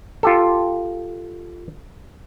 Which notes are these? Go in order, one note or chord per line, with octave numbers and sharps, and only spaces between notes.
F4 G4 A4